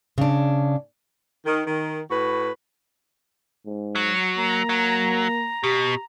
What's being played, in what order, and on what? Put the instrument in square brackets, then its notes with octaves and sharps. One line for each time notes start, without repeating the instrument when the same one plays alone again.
[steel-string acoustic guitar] C#3 D4
[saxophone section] D#3
D#3
A2 F#4 B4
[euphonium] G#2
[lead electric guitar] F#3
[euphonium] A#3 [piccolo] A#5
[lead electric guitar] F#3
[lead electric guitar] B2 [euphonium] G4